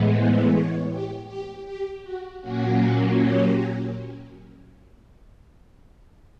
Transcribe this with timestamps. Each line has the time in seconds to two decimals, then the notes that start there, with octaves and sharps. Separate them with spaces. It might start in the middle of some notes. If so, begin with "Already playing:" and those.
Already playing: A2 E3 G#3 B3
0.14 C5
0.52 C#5
0.90 G4
1.28 G4
1.65 G4
2.03 F#4
2.41 A#2 F#3 A#3 C#4 F#4
3.16 G4